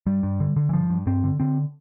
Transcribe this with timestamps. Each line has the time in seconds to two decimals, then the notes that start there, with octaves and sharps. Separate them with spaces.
0.07 G2 G3
0.23 G2
0.40 D3
0.56 D3
0.69 E3
0.73 G2 F3
0.90 G2
1.07 G2 C4
1.24 D3
1.40 D3 C4